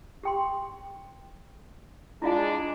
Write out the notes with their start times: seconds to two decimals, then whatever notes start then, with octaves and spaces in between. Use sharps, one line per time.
0.23 G4 G5 C6
2.22 G#3 D4 E4 F4 F5